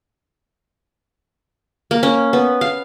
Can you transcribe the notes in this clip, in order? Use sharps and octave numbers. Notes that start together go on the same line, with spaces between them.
A#3
C#4
B3
F5